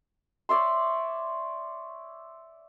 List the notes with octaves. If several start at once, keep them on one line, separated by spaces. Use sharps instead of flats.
C#5 D5 E5 C6